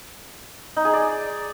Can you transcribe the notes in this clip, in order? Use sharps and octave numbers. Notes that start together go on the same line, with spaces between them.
D#4
G#4
D5